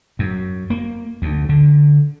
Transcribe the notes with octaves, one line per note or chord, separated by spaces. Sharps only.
F#2
A#3
D2
D3